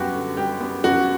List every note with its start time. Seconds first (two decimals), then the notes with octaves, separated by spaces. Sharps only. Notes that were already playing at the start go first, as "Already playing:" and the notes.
Already playing: F#2 G3 B3 F#4 G4
0.14 D3
0.37 G3 G4
0.60 B3
0.84 F#2 F#4